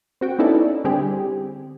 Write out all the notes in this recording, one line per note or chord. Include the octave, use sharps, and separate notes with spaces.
C4 F#4 G5
B3 C#4 D#4 E4 A4 D5
D3 G3 C4 G4 G#4